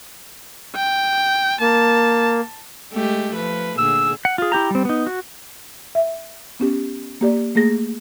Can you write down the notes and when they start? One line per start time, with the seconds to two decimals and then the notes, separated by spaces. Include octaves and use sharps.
0.76 G5
1.61 A#3 A5
2.92 G#3 A3 G4
3.35 F3 B4
3.78 A#2 D3 G#4 E6
4.25 F#5
4.38 F4 G#4
4.52 E4 G4 G5 A#5
4.71 G3 C4
4.85 B3 D#4
5.07 F#4
5.95 E5
6.60 B3 C#4 G4
7.21 A#3 G4 D5
7.55 A3 A#3 G#4 A#6